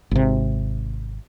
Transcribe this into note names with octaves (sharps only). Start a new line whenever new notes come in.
G#1 C3